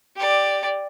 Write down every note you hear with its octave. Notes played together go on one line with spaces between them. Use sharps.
G4 D5